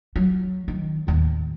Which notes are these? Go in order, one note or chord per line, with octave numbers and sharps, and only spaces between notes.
F#3
D#3
A1 D#2